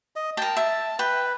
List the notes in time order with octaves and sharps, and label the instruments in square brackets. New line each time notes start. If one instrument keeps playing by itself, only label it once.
[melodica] D#5
[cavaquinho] A#4 G5 [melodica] A5
[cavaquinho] E5
[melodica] B4 [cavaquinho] G5